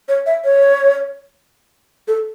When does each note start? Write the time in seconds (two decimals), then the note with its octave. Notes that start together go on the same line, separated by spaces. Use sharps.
0.08 C#5
0.26 E5
0.44 C#5
2.08 A4